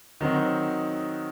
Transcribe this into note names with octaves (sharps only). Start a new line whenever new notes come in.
D#3 F#3 C4 D#4 F#4